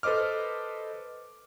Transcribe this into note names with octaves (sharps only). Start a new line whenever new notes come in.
A4 B4 C5 D#5 D6 F6